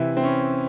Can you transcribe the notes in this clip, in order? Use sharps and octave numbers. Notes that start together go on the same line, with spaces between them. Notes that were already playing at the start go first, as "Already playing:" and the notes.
Already playing: C3 E3 E4
C4
C#4